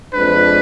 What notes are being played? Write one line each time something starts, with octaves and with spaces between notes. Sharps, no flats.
F2 F3 G#3 D4 B4